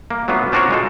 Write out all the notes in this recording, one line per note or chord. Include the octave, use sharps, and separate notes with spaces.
A#3
F#3 A3 B3 D4 F4
C4 D4 F4 F#4 A#4 C#5
G#3 F4 A4